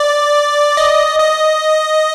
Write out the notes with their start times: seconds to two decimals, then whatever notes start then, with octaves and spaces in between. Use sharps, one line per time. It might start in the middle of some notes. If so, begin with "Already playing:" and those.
Already playing: D5
0.77 D#5
1.19 D#5